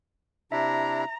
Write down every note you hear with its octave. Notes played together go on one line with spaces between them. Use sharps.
C3 D4 E4 E5 A#5